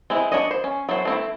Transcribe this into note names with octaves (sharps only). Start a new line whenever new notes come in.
G#3 C4 E4
D4 C#5 D#5
C5
C#4
F#3 E4 A4 C5
A3 C4 E4